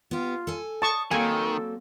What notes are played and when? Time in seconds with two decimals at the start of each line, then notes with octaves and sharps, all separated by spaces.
0.11 B3 F4 G4
0.47 A4 G#5
0.82 A5 C#6 D#6
1.11 D#3 F#3 A#3 C4 A4 G#5